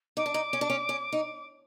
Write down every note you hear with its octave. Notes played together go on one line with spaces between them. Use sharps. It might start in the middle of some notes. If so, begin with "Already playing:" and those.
D#4 D6
D4
D#4
C#4
D4
C#4
C#4
D#4